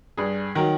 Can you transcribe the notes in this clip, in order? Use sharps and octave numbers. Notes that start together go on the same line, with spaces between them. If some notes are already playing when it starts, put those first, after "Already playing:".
G2 G#4
D#3 F#3 A#4